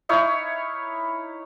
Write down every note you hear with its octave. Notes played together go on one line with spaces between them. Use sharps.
D#4 E4 C#5 F5